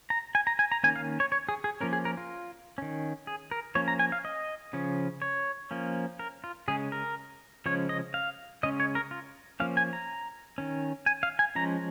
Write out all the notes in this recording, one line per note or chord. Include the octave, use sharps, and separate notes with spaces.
A#5
G#5
A#5
G#5
A#5
D#3 A#3 C#4 G#5
F5
C#5
C#5
G#4
G#4
F3 A#3 C#4 A#4
G#4
A#4
F4
D#3 C#4
G#4
A#4
F3 A#3 C#4 C#5
A#5
G#5
F5
D#5
C#3 F3 C#4
C#5
F3 A#3 C#4
A#4
F4
C#3 G#3 C#4 G#4
A#4
C#3 F3 G#3 C#4 C#5
D#5
F5
C#3 G#3 C#4 D#5
C#5
A#4
F4
F3 A#3 C#4 F5
G#5
A#5
D#3 C#4
G#5
F5
G#5
F3 G#3 C#4 A#5